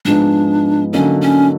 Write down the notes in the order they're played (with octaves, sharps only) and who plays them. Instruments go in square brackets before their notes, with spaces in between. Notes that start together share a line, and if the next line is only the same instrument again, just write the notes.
[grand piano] G#2 F3 G#3 B3 D#4 [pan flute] D4
[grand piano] D3 F#3 A#3 D#4 [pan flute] C#4
[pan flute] C#4